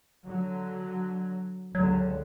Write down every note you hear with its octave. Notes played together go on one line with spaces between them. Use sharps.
D3 F#3
C#2 G2 D3 F#3